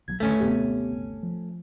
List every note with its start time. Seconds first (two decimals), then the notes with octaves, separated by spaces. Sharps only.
0.08 B1 F3 F#3 G#6
0.20 D#2 A2 D3 A3 C#4
0.40 D#2 A2 C3 B3 G4
0.91 G1
1.23 F3